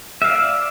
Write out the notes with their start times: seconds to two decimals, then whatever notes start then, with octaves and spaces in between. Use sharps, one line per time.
0.22 E5
0.24 F5
0.27 D5